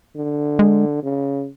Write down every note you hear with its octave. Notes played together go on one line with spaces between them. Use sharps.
D3
G#3
C#3